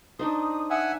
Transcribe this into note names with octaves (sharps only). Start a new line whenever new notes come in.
D4 D#4 C5 D#6
E5 F#5 G#5